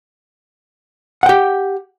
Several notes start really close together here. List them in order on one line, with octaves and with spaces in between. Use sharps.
F#5 G5 G4